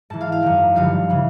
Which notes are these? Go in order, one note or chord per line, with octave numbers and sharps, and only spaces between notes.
G#2 E3 A5
F5
F5
F#2 D#3
G2 D3 F3 F5
C#3 E3